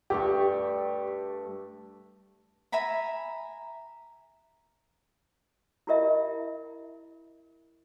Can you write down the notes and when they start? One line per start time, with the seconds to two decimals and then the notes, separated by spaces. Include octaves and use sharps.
0.10 G2 A3 G4 C#6
2.72 E5 G#5 A#5 B5
5.87 E4 F4 G4 A#4 D#5 E5